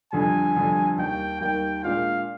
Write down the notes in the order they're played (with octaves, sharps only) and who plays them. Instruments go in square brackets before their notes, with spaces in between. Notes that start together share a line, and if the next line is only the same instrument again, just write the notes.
[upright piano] F2 D3 G3 [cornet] G#5
[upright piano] F2 D3 G3
[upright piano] D#2 D#3 G3 [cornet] G5
[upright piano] D#2 D#3 G3 [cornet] G5
[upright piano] A#2 G#3 D4 F4 [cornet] F5